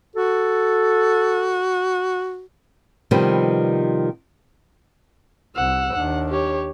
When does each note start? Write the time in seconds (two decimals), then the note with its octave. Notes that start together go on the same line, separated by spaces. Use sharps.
0.16 F#4 A4
3.11 C3 D#3 F3 G3 B3
5.56 C2 F#5 E6
5.95 D#2 D4 F#5
6.29 G4 C#5